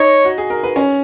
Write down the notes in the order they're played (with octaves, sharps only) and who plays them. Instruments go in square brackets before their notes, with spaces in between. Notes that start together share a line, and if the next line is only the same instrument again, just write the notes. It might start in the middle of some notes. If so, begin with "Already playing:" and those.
Already playing: [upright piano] D#4 D#5 [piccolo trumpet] C#5
[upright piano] F#4
G#4
A#4
B4
C#4 C#5